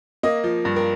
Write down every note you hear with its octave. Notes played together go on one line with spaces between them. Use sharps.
A#3 D#5
F3
G2
A#4